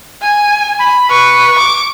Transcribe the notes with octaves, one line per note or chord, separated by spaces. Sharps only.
G#5
B5
B4 C#6
D6